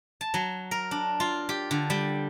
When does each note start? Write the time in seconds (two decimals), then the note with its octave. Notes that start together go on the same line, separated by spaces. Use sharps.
0.21 A5
0.34 F#3
0.71 A#4
0.91 D4
1.20 F4
1.49 G4
1.71 D3
1.90 G3